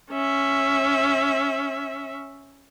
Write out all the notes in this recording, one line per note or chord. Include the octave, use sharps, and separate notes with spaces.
C#4 E5